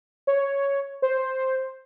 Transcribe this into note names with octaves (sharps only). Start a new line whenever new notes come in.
C#5
C5